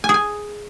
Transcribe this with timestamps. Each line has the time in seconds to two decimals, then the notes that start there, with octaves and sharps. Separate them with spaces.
0.04 G#5
0.09 G#4
0.14 G#5